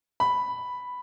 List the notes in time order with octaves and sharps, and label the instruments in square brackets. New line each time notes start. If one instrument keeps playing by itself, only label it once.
[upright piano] B5